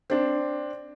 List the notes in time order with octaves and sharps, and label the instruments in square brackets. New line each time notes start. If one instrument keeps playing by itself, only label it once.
[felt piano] C4 D4